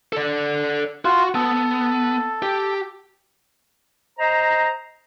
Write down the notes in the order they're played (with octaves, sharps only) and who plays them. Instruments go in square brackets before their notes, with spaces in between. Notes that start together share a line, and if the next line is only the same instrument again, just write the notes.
[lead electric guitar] A4 D5
[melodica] F4 [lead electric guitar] F#4 F#5
[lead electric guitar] B3 [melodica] A4
[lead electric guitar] G4
[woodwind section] C5 D#5 A#5